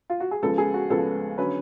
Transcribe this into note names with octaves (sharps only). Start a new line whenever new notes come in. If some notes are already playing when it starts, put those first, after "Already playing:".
F4
F#4
G#4
C#2 C#3 F3 B3 A4
G#4
F#4
C#2 C#3 F3 B3 A4
D3 F#3 C#4 B4